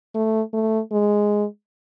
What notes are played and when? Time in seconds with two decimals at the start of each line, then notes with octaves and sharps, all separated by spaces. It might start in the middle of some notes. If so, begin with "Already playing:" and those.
0.15 A3
0.53 A3
0.92 G#3